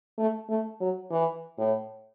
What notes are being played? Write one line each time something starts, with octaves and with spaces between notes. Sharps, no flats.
A3
A3
F#3
E3
A2